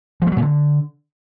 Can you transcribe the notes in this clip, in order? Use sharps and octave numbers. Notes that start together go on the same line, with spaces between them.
F3
A3
F#3
A#2
D3